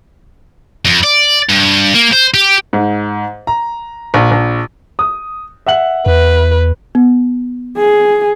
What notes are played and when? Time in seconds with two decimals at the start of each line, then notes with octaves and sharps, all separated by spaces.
0.85 F2
1.04 D5
1.50 G2
1.94 A#3
2.12 C5
2.34 G4
2.73 G#2
3.47 A#5
4.14 A#1
4.31 A#1
4.99 D#6
5.66 E5 F#5 F#7
6.06 E2 B4
6.95 B3
7.78 G#4